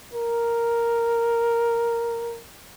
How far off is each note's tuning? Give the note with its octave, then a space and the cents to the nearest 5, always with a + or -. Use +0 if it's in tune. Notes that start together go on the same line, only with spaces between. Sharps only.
A#4 +0